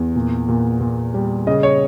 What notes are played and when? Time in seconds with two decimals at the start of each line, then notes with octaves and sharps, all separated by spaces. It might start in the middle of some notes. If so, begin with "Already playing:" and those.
Already playing: E2
0.16 A#2
0.48 A#2
0.81 A#2
1.14 G3
1.47 C#3 D#5
1.63 C#5